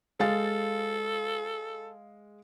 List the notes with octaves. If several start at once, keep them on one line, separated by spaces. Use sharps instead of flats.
G#3 A4 F5 A6